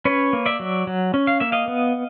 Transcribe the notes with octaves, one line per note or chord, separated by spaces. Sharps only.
C#4 B4 C#5
A#3
D5 E5
F#3
F#3
C#4
F5
A#3 E5
D#5 F5
B3